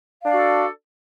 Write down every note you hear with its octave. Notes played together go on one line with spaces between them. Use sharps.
D4 F#4 A4 D5 F5